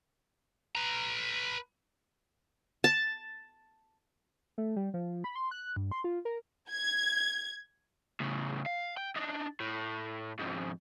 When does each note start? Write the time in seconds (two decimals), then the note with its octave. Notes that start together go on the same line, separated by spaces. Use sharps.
0.75 B4 A#5
2.84 A5
4.58 A3
4.76 G3
4.94 F3
5.24 B5
5.36 C6
5.51 F#6
5.76 G2
5.91 C6
6.04 F4
6.25 A#4
6.71 G#6
8.20 A2 C#3
8.66 F5
8.97 G5
9.16 D4 D#4
9.60 A2
10.39 F2 G#2